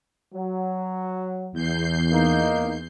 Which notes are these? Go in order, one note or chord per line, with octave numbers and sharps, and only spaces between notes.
F#3
E2 G6 C7
A#3 D#4